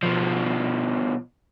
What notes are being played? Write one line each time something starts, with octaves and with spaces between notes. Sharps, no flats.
B2 F3